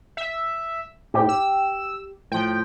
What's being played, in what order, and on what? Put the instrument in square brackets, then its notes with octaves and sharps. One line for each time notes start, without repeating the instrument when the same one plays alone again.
[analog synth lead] E5
[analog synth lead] A2 [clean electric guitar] G4
[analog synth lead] E6
[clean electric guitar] A2 F3 [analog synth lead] G5